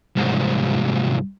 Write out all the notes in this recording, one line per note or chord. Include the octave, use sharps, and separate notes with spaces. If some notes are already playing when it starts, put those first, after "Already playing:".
C2 G#2